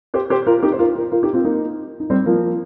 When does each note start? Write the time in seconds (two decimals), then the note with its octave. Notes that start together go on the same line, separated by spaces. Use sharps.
0.14 G4 C5
0.30 G4 C5
0.47 F4 A#4
0.63 D#4 G4
0.72 C5
0.79 F4 A#4
0.96 F4 A#4
1.11 F4 A#4
1.23 D#4 G4
1.33 C4 F4
1.44 A#3 D#4
2.00 D#4
2.10 G3 C4
2.26 F3 A#3